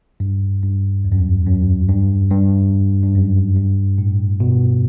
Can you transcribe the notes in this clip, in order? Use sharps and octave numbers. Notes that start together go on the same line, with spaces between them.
G2
G2
E2
F#2
E2
F#2
G2
G2
G2
F#2
G2
A2
B2